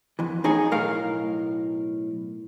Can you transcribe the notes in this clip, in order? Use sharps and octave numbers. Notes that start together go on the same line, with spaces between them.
F2 E3
A2 D#4 G#4 C#5 G#5
B1 A2 A#4 F5